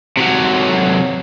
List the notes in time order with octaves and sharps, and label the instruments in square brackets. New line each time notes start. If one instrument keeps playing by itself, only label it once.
[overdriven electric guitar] C3 F#3